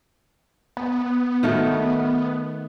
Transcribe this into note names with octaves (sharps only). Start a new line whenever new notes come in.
B3
D#3 A3 F#4